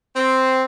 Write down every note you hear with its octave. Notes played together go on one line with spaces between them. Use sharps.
C4